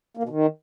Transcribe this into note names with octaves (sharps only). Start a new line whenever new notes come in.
A#3
B2
D#3